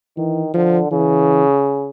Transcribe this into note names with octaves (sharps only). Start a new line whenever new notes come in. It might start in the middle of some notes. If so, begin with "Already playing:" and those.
D#3 E3
D3 F3
C#3 E3